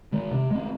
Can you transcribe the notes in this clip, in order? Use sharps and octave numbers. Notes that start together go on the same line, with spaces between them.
D#3 G#3
C3
G#3 C4